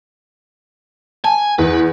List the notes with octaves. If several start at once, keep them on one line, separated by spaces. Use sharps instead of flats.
G#5 A5
E2 B4